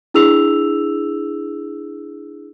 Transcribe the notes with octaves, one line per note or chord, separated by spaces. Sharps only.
D4 E4 G#4 E6 F7